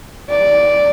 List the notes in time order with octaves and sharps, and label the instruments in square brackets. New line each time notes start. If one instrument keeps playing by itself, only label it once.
[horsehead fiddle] D5